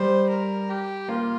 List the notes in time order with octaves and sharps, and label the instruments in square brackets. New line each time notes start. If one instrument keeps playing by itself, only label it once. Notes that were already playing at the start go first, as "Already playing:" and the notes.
Already playing: [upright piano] G3 [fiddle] C5
[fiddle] A#4
G4
[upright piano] A#3 [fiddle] F4